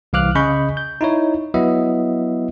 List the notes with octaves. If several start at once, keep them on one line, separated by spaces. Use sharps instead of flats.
C2 E3 F5 D6 F6 F#6
C#3 G#4 D#5 B5 C#6 G6
G6
D#4 E4 C#5
F#3 B3 E4 D#5 E5